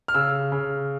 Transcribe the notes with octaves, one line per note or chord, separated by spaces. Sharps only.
F6
C#3 E6
C#3